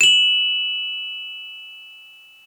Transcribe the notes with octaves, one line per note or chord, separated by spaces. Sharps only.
E7 F#7